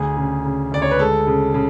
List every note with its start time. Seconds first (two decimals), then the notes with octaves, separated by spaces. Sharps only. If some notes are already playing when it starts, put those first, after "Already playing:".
Already playing: D2 G#4
0.17 C#3
0.44 C#3
0.72 D2 D5
0.82 C#5
0.91 B4
0.99 G#3 A4
1.27 C#3
1.54 C#3